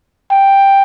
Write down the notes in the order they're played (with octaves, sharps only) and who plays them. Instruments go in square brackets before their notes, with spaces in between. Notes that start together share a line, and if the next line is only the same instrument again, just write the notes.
[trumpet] G5